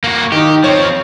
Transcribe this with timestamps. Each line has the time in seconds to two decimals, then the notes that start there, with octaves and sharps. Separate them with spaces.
0.04 A#3 F#4
0.32 D#3 D#4 G4
0.64 F3 C4 C#5